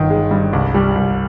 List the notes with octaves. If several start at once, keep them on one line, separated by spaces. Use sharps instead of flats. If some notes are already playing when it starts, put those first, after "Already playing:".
Already playing: G1 D#3
G#3
G2
C2
G3
C2